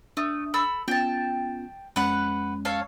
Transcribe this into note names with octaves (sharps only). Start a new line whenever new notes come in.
A3 D4 D#6
A4 B5 E6
B3 C#4 F4 G5 A5
F2 G#3 C#4 B4 F#5
A4 C#5 F5